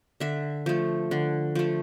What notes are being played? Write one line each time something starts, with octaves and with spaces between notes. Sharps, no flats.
D3 E5
F3 A3
D3
F3 A3